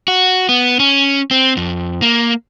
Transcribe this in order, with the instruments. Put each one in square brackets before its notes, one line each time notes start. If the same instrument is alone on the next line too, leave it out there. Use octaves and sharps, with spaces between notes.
[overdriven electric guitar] F#4
B3
C#4
C4
F2
A#3